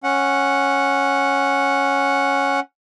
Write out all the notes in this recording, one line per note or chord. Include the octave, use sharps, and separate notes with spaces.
C#4 F#5